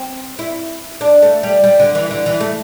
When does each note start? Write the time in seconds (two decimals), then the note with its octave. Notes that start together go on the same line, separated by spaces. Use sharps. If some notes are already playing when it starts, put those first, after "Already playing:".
Already playing: C4
0.39 E4
1.01 D4
1.22 A3
1.43 G3
1.64 G3
1.80 D3
1.95 E3
2.11 D3
2.26 E3
2.40 A3